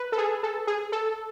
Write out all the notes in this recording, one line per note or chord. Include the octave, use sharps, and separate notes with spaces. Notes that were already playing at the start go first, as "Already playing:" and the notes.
Already playing: B4
A4
G#4
A4
G#4
A4